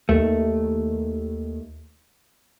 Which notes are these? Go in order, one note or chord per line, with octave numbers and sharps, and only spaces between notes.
D#2 A3